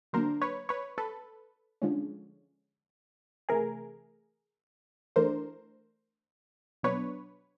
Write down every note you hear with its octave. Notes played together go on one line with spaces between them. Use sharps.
D3 F#3 A#3 D4 A#4 C5
B4 C#5
B4 C#5
A4 B4
D3 F3 G#3 C#4
C3 E3 A3 G#4 A#4
E3 A3 D4 A#4 C5
B2 F#3 B3 D4 B4 C#5